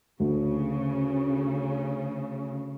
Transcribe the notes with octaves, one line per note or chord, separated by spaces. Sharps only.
D2 C#3